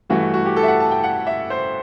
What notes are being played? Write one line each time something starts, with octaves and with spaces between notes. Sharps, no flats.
G2 E3 A3 F#4
F#4
G4
A4
E5
F#5
A5
G5
F#5
E5
C5